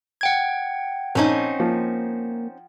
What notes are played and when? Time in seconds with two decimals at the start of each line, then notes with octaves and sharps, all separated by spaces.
0.21 F#5 G5 G#6
1.15 A#1 C4 C#4 D#4
1.60 F3 A#3